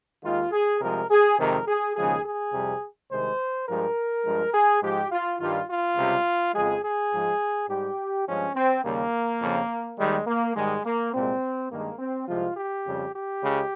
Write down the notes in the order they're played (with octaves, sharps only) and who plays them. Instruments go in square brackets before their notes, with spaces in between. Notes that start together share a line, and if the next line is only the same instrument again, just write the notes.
[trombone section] D#2 D#3 G#3 F4
G#4
C2 C3 F3 G#3 A#4
G#4
F2 C3 D#3 G#3 A#4
G#4
D#2 C#3 F3 G#3 G#4
G#4
F2 C3 G3
C2 C3 D#3 G#3 C5
G2 F3 G#3 A#4
G2 F3 G#3
G#4
G#2 F3 G#3 G4
F4
G2 D#3 G3 F4
F4
C#2 C3 G3
F2 C#3 F3 G#3 G#4
G#4
G#2 F3 G#3
G#2 G3 G4
G2 F3 G#3 C#4
C4
D#2 C#3 G3 A#3
F2 C#3 F3
D#2 D#3 G3 G#3
A#3
G#2 D#3 G3 G#3
A#3
C2 A#2 G#3 C4
G2 D#3 G#3 A#3
C4
C2 C3 F3 G#3 F4
G4
F2 C#3 G3
G4
C#2 C#3 G#3